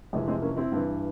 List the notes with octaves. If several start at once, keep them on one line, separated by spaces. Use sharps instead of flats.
F2 C3 E3 G#3
G#3 C4
A#3 C#4
C4 E4
G2 E3